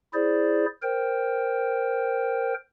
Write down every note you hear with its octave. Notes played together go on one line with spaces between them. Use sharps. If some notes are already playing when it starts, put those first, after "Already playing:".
E4 G#4 C5 D5
A#4 C5 G5